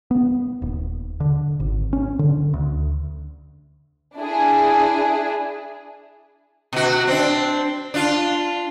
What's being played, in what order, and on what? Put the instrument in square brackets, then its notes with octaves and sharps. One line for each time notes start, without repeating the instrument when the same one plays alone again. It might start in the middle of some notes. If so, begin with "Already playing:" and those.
[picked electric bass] B3
D#1
D3
G#1
C#4
D3
D2
[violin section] D4 E4 G#4
[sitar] B2 F#4
C4 D4
D4 F4